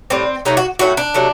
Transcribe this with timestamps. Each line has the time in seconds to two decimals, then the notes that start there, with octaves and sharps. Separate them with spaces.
0.10 A2 G3 C4
0.45 C3 F#3 A3 D#4
0.57 F#4
0.79 A2 F#3 A3 F#4
0.97 D4
1.14 C3 F#3 A3